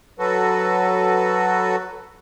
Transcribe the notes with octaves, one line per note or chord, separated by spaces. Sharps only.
F#3 F#4 A4 B4